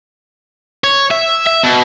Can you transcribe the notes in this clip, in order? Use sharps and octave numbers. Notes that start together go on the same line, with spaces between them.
C#5
E5
E5
B2